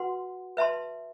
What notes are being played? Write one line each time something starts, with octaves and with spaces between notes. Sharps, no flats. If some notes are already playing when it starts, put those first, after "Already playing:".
Already playing: F#4 B4 F#5 C6
B4 E5 A5 C6